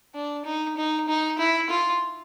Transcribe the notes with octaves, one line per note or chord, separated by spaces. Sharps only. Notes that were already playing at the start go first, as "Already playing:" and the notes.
D4
D#4
D#4
D#4
E4
F4